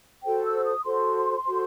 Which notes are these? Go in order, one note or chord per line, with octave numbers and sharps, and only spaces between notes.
F#4 A4 C5 G5
E6
D#6
F#4 A4 C5 C6
F#4 A4 C5